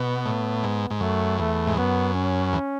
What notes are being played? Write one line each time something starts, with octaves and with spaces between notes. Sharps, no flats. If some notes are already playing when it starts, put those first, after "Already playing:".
Already playing: B2 B3
A2
G#2
G#2
F#2 A3
E2 A3
G#2
F#2 B3
C#4
E2